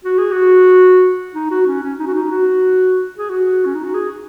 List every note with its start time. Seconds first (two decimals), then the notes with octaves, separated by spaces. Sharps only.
0.05 F#4
0.18 G#4
0.32 F#4
1.35 D#4
1.51 F#4
1.67 C#4
1.83 C#4
2.00 D#4
2.07 F#4
2.15 D#4
2.31 F#4
3.18 G#4
3.30 F#4
3.66 C#4
3.75 D#4
3.84 F#4
3.95 G#4